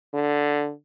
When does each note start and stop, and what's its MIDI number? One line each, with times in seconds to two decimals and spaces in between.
0.14 0.72 50